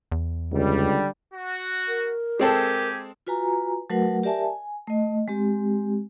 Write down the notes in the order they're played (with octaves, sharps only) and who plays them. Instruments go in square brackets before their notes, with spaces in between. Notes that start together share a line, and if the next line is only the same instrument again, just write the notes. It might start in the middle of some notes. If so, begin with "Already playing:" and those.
[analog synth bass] E2
[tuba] C#2 [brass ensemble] D3 G3
[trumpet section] F#4
[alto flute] A#4
[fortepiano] G#3 C4 A4 [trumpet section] G4 G#5
[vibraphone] F4 F#4 B4 G#5 A#5
F#3 A3 F#4 A#4 B4 F#5
G4 A#4 D5 E5 G#5 A5
G#5
A3 D#5
G#3 C4 G4